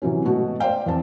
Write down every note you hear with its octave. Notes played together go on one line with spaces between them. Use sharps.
C3 E3 F#3 C#4
G#2 B2 A3 F#4
C5 D5 F5 G5
E2 C4 A5